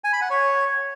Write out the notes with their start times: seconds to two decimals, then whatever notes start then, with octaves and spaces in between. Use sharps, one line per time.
0.04 G#5
0.13 B5
0.22 F#5
0.30 C#5